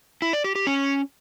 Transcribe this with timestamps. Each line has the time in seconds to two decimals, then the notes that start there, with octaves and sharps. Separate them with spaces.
0.22 E4
0.33 D5
0.44 G4
0.56 G4
0.67 C#4